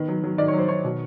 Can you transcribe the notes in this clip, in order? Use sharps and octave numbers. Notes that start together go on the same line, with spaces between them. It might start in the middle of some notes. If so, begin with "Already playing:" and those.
Already playing: D#3 B3
F#3
F#3
D#3 D5
C#5
F#3 C5
D#3 C#5
B2